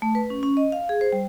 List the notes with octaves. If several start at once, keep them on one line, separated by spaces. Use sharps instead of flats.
A3
B4
C#4
C#4
D#5
F5
G#4
C5
G3